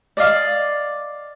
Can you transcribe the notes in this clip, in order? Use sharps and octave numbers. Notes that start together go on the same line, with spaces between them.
D5 D#5 F5 D6